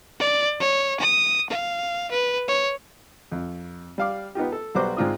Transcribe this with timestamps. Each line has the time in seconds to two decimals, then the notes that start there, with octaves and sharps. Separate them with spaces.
0.20 D5
0.60 C#5
1.00 D#6
1.50 F5
2.11 B4
2.48 C#5
3.32 F2
3.98 G3 F5 D6
4.35 B3 D#4 F4 G4
4.52 A4
4.75 B1 G3 B3 F#4 C5 D6
4.97 G#2 G#3 C4 F4 D5 D#6